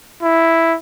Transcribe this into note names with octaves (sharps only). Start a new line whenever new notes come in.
E4